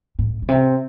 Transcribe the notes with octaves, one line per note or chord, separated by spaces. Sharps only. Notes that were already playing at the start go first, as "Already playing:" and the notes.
A2
A2
C3